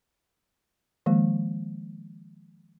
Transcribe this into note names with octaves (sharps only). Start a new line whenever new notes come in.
D#3 F3 G#3 A#3